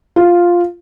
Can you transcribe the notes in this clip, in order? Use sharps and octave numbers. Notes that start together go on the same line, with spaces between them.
F4